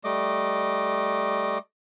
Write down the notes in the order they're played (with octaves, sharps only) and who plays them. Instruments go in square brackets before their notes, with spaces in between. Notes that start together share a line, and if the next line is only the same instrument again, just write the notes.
[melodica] G3 A3 D#5 D6